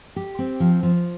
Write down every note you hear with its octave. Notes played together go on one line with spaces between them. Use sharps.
G4
C4
F3
F3